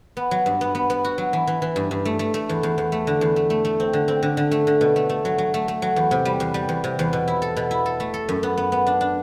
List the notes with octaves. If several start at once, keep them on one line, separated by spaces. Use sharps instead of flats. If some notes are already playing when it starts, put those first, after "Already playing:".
B3
F#3
G2
B3
B3
B3
F#4
F#3
E3
E3
E3
G2
G2
A3
A3
A3
E2
E2
E2
A3
D3
E2
A3
A3
A3
C4
D3
C4
D3
D3
A3
D3
B2
A3
A3
F#3
F#3
A3
A3
F#3
E2
C3
G3
E2
G3
E2
C3
E2
B2
E4
A4
B2
E4
A4
A3
A4
F#2
B3
B3
B3
D4
D4